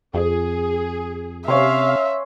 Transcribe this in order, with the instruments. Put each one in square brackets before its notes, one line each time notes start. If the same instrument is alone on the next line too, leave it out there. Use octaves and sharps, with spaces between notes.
[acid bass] F2 [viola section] G#4
[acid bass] C3 [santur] C#4 C#5 C6 [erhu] E5 [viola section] F5